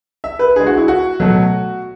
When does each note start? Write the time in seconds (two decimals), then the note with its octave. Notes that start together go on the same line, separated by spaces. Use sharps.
0.24 E5
0.39 B4
0.56 D3 G#4
0.60 G#3
0.66 F#4
0.77 E4
0.88 F#4
1.20 B2 F#3 A3